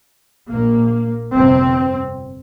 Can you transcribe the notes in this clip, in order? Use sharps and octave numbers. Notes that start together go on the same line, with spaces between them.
A#1 A#2 A#3
G1 F2 C3 C4